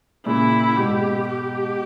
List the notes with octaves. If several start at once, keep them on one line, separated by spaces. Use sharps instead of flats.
A#2 C#3 E4
G#2 B2 G4
G4